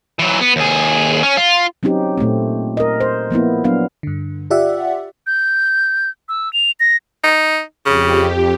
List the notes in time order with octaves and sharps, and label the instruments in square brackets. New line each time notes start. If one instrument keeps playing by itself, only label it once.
[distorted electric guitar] E3 F#3
B3
D#2 G#4
C#4
F4
[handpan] F#3 C4 C#4 D#4 G4
A#2 A3 A#3 C4
A#4 D#5
C5
F3 A#3 B3 E4
F#3 B3 D4 F5
[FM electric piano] G2 D3
F4 G4 D5 E5 F#5
[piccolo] G6
E6
F7
A#6
[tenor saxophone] D#4
[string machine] F2 G4 [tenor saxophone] C#3